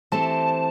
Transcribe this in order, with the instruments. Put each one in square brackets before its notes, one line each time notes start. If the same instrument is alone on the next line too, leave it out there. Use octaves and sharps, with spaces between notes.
[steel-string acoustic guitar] E3 A3 C4 G4 C5 [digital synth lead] A5